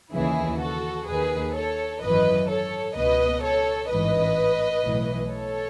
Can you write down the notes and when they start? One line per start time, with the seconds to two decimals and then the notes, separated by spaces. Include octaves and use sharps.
0.13 D#2 C#3 E3 E4 G#4
0.60 F#4 A4
1.07 D#2 D#3 G#4 B4
1.55 A4 C#5
2.01 G#1 F#2 E3 B4 D#5
2.49 A4 C#5
2.95 C#2 B2 B4 D#5
3.43 A4 C#5
3.90 A1 G#2 E3 B4 D#5
4.84 B1 A2 E3
5.31 A4 C#5